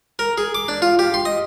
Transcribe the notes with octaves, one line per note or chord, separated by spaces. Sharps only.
A#4
G#4
D6
D4
F4
G4
C6
D#5